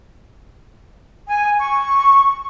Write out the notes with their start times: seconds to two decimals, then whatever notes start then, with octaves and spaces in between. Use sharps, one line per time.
1.27 G#5
1.59 C#6